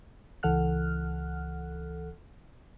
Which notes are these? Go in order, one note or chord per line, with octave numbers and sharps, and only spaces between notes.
C#2 E3 A4 F#5 F6 F#6